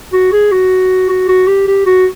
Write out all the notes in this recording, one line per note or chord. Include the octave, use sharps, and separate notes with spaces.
F#4
G#4
F#4
F#4
F#4
G4
G4
F#4